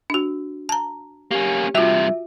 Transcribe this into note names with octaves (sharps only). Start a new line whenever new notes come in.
D4 F#4
A5 A#5
A#3 C#4 G4
G2 C3 F4 F#4 E5